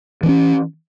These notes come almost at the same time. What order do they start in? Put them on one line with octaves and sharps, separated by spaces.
E3 C4 C#4